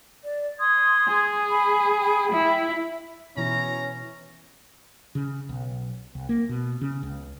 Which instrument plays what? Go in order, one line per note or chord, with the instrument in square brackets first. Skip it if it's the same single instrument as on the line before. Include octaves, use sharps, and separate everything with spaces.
[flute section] D5
C6 D#6 G#6
[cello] G#4
[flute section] B5
G5 B5
[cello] E4
[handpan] B2 E3 E4 [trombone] C#4 [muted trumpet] A#5
[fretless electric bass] C#3
B1
C2
A#3
B2
C#3
C#2